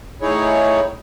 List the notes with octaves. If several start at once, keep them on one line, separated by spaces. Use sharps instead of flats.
A2 D#4 E4 G#4 C#5